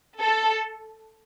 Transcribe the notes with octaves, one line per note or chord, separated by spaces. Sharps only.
A4